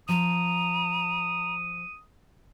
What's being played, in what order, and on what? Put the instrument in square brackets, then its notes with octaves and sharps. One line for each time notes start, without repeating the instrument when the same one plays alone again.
[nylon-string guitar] F3 [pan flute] A#5 [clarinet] D#6